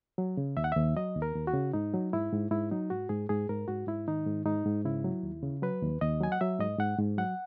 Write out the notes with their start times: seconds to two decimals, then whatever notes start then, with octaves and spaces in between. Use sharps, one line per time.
0.18 F#3
0.37 C#3
0.57 D#2 E5
0.64 F#5
0.72 D#2 E5
0.97 F#3 D#5
1.15 D#2
1.22 A#4
1.35 D#2
1.47 F#4
1.54 C#3
1.73 G#2 D#4
1.94 F#3
2.13 G#2 E4
2.33 G#2
2.51 G#2 E4
2.71 F#3 D#4
2.90 G#2 F#4
3.09 G#2 G#4
3.29 G#2 G#4
3.49 G#2 A#4
3.68 G#2 F#4
3.87 G#2 E4
4.08 D#3 D#4
4.27 G#2
4.46 G#2 D#4
4.66 G#2
4.85 C#3 E4
5.04 F#3
5.23 D#2
5.43 C#3
5.62 F#3 B4
5.82 D#2
6.01 D#2 D#5
6.21 F#3 G#5
6.32 F#5
6.41 F#3 E5
6.59 G#2 D#5
6.79 G#2 F#5
6.98 G#2
7.18 F#3 F#5